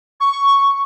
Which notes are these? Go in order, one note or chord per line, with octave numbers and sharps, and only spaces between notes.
C#6